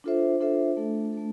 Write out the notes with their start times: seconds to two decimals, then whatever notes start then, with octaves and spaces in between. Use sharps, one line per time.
0.04 D4 F4 A4 C5 E5
0.40 D4 F4 A4 C5 E5
0.77 A3 D4 A4
1.13 A3 D4 A4